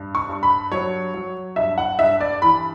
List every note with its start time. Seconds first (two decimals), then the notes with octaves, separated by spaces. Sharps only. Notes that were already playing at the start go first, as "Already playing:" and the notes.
Already playing: G2
0.15 C#6
0.29 G2
0.43 B5
0.71 F#3 C#5
1.14 F#3
1.56 G2 E5
1.78 F#5
1.99 G2 E5
2.21 D5
2.42 E3 B5